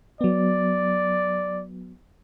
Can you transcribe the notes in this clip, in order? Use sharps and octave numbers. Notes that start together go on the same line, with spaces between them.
F#3 B3 D5